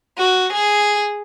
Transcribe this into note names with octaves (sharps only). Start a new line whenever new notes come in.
F#4
G#4